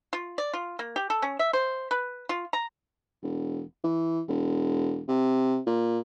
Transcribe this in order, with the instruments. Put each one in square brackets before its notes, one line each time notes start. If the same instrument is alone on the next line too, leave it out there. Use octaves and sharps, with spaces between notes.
[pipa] F4
D5
F4
A#3
G4
A4
C#4
E5
C5
B4
F4
A#5
[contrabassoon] E1
E3
E1
C3
A#2